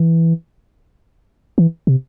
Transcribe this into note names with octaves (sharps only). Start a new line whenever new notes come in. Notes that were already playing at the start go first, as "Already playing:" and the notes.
Already playing: E3
E3
C3